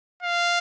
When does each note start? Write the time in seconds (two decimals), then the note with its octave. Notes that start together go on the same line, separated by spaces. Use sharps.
0.23 F5